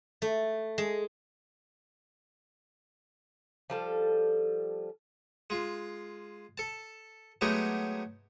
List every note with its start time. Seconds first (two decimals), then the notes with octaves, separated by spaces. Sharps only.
0.22 A3
0.78 G#3
3.70 F3 G3 A4
5.50 G#3 F4
6.58 A4 A5
7.41 F#3 G#3 A3 B3 D#4 G4